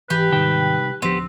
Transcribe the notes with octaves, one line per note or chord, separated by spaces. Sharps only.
G#1 E3 G4 B4
C2 G#2 D#3 D#4 G5
D1 F3 B3 C4 D4 G4